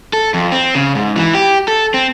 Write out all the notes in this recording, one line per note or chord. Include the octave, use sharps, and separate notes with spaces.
A4
F2
C4
C#3
G#2
E3
G4
A4
C4